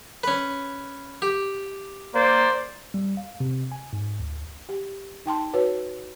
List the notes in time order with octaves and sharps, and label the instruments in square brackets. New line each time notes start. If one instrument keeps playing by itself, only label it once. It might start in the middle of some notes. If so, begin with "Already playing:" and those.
[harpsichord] C#4 B4
G4
[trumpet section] A#3 C5 D5
[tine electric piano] G3
F5
C3
G#5
G#2
D2
[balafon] G4
D#4 G5 A5 C6
F#4 B4 C#5